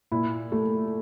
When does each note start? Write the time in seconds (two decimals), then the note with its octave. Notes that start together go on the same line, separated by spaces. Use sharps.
0.12 A#2 E4
0.52 A3